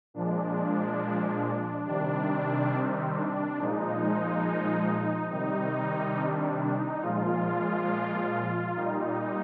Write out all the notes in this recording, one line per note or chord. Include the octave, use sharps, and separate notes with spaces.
A#2 F3 G#3 D4
C3 D#3 G3 D4
C4
D4
A#2 F3 G#3 D#4
C3 D#3 G3 D#4
D4
D4
D#4
A#2 F3 G#3 F4
A#2 G3 D#4